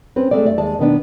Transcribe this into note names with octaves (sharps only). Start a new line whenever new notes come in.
C4 C#4 B4
G#3 A3 C4 D5
G2 D5 E5
D#2 G#3 D5 A5
B2 D#3 B3 D4